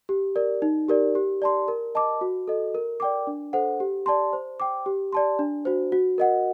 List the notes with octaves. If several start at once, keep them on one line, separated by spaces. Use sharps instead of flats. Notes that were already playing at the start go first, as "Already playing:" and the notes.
G4
A#4 D5
D#4
G4 A#4 D5
G4
D5 A5 C6
A#4
D#5 A5 D6
F#4
A4 D#5
A#4
D5 G5 D6
D4
A4 C5 F#5
G4
D5 A5 C6
C5
G5 D6
G4
D5 A5 C6
D4
F#4 C5
F#4
A#4 D#5 F#5